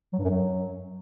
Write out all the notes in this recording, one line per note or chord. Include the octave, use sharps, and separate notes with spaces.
F#3
G2
F#2
F#3